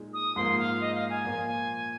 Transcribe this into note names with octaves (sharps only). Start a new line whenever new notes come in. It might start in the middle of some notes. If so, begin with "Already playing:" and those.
Already playing: A#2 G#3 D#4
D#6
G#2 F3 A#3 F4 C6
F5
D#5
F5
G#5
A#2 F3 A#3 F4